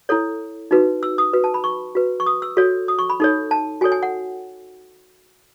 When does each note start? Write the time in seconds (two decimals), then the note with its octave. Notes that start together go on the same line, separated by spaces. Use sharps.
0.09 E4 A4 C#5
0.71 D#4 F#4 B4
1.03 E6
1.18 D#6
1.33 F#4 B4
1.44 A5
1.54 B5
1.64 C#6
1.95 F#4 B4
2.20 C#6
2.26 D#6
2.42 E6
2.57 F#4 A4 C#5
2.88 D#6
2.99 C#6
3.10 B5
3.20 D#4 A4 C#5
3.51 A5
3.81 F#4 A4 C#5 G#5
3.92 G#5
4.03 F#5